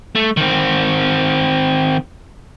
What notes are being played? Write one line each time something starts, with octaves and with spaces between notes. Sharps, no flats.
A3
D#3 C4